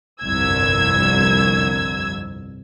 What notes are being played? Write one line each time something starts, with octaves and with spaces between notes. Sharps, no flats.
G1 C2 F2 E6 G#6